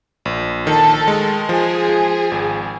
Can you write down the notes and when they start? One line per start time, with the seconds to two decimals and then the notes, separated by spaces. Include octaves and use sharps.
0.25 A#1
0.67 D#3 A4
1.08 G#3
1.49 F3 G#4
1.89 F3
2.31 G#1